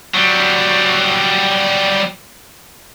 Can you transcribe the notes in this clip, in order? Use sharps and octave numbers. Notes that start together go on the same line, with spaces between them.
F#3 G3